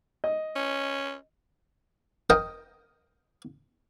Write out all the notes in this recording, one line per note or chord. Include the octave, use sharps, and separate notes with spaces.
D#5
C#4
A#4 D#5 G5